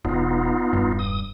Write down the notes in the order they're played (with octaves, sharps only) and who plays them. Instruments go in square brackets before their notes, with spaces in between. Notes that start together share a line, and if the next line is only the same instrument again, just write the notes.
[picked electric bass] E1 [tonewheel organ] B3 D#4 F4
[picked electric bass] E1 G2
[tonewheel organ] D#6